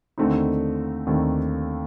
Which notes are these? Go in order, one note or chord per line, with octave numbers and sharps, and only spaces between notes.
D#2 D3 A3 C4 D#4
D#2 D3 A3 C4 D#4